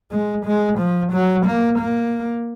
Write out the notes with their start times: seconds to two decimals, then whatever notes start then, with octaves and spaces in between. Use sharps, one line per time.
0.11 G#3
0.46 G#3
0.79 F3
1.12 F#3
1.46 A#3
1.79 A#3